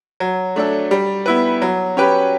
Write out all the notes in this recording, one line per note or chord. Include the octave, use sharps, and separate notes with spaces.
F#3
A3 D4 A4
G3
B3 E4 B4
F#3
C#4 G4 B4